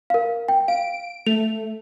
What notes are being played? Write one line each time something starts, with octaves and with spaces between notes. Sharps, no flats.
A#4 F5
G5
F5 D7
A3 F7